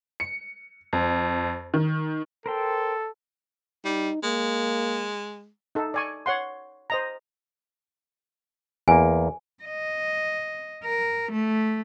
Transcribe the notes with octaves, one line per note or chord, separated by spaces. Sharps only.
C#7
F2
D#3
A4 A#4 C5 G5
G3 D#4
G#3 A#3
D#4 A4
D5 G#5 C#6
C#5 F#5 C6
C5 D#5 A#5
E2 A#3 G#5
D#5
A#4
A3